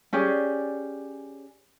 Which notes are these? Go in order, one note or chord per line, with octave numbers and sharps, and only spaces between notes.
C#4 G4 G#4 D5